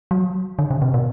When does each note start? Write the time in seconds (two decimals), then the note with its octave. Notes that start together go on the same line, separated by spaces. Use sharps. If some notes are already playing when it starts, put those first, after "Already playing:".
0.11 F#3
0.59 D3
0.71 C#3
0.82 C3
0.94 B2